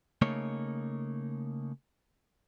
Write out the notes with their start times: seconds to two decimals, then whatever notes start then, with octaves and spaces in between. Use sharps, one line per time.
0.22 C#3 A3 A#3 D#4 C#5